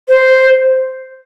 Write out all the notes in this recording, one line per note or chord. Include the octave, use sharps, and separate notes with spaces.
C5